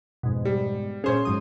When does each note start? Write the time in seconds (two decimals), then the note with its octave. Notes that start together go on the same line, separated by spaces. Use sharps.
0.23 F2 G#2 B2
0.45 G3
1.04 A#2 C#4 G#4 C5 C#5
1.25 G#2 F#3 D#6